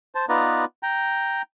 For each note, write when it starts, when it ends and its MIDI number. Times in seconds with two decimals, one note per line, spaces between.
0.15 0.25 72
0.15 0.25 81
0.29 0.65 59
0.29 0.65 63
0.29 0.65 65
0.29 0.65 71
0.29 0.65 74
0.29 0.65 82
0.83 1.42 79
0.83 1.42 82